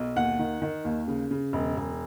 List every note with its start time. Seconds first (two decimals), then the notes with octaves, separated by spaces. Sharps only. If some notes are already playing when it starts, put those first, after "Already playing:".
Already playing: B1
0.16 D#2 F#5
0.39 D#3
0.62 D#3
0.85 D#2
1.08 C#3
1.31 C#3
1.53 E1
1.77 E1